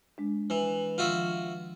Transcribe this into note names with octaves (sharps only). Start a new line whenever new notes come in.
G#3 D4
E3
D#3 F3 F4 F#4 E5